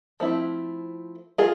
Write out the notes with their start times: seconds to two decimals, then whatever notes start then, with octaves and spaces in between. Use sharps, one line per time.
0.20 F3 A3 C4 E4
1.38 F4 G#4